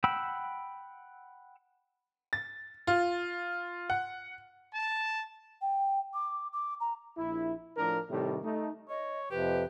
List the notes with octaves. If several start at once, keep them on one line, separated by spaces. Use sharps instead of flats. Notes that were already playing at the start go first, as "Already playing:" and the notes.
F#5 G5 B5 E6
A6
F4
F#5
A5
G5
D6
D6
A#5
A#1 E4
A2 F3 D4 A#4
A2 C3 D#3 G3 A3
A3 D#4
C#5 D#5
F2 C3 F3 G4 B4